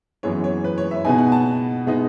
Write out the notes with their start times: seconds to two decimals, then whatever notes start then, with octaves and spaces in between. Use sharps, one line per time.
0.23 F#2 E3 G#3 B3 C#5
0.44 C#5
0.64 B4
0.78 C#5
0.91 E5
1.05 B2 G#3 B3 D#4 G#5
1.18 F#5
1.32 A5
1.86 B2 G#3 B3 D#4